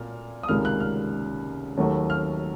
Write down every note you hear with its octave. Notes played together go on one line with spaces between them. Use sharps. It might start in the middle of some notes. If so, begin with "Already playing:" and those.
Already playing: A#2 F6
D#6
C#2 C3 D#3 A#3 F6
F#6
F6
D#2 D#3 F#3 A3
F6